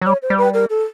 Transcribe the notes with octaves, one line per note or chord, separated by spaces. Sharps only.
F#3
G3 C#5
C5
G3
B4
A#4
A4